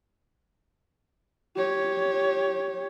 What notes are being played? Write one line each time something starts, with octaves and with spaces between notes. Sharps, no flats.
G4 C#5